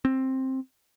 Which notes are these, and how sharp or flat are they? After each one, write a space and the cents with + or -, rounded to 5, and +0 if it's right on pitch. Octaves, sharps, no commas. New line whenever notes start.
C4 +10